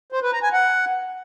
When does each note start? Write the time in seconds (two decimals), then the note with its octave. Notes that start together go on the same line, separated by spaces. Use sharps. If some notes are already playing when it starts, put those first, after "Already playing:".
0.12 C5
0.23 B4
0.33 A#5
0.43 G#5
0.53 F#5